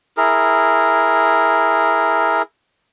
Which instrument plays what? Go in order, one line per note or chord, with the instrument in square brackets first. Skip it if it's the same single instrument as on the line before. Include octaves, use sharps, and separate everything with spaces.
[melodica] E4 G#4 A#4